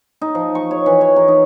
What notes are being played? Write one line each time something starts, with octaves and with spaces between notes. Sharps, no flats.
D#4
F3
C#6
C#5
E3
C#5
A#4
D#4